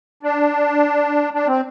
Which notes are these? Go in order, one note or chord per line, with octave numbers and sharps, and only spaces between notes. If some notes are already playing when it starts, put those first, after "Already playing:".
D4
D4
C4